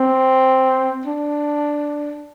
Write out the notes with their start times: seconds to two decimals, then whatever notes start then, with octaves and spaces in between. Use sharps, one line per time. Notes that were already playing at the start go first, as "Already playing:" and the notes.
Already playing: C4
1.05 D4